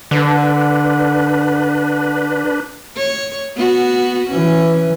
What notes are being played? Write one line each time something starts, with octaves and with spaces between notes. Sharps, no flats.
D3 D4 B4
C#5
B3 F#4
E3 C#4